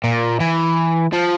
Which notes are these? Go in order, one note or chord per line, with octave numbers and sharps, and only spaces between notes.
A#2
E3
F3